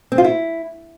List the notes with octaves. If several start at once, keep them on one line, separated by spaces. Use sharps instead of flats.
C4
F4
E4